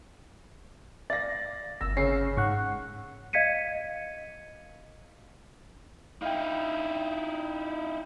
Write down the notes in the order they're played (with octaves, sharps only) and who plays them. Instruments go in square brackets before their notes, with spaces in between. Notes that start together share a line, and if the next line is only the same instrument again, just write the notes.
[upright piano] D5 F5 A#6 [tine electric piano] A6
[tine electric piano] G1 A#6 [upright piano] E6
[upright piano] C#3 C7 [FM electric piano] C#4
[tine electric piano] G#2 [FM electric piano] F#5 C#6
[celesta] D#5 F5 G#6 B6 C#7 D#7
[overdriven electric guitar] D#4 E4 [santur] F5 G5